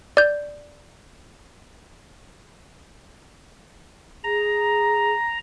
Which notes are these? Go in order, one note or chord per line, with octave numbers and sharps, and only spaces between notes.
D5 G6
G#4 A#5